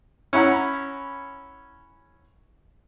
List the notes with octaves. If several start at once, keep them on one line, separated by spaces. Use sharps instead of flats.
C#4 E4 F#5 A#5 B5